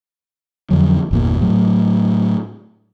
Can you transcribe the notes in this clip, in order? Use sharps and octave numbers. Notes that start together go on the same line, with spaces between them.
F2 D3 F#3
G1 E2 A#2
A2 F#3